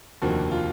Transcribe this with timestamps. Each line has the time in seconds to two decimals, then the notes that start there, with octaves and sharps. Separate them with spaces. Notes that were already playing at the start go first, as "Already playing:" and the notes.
0.22 F1 D#2 D3 F3 A#3 F#4
0.51 F4